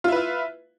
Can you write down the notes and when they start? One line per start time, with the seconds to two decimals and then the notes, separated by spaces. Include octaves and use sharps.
0.04 F4
0.08 E4
0.12 B4
0.16 E5